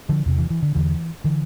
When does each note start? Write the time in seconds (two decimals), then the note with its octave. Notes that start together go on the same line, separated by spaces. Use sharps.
0.09 D3 F3
0.26 E2 C3
0.38 E3
0.50 E3
0.62 D3
0.75 E2 D3 E3
1.24 D3 E3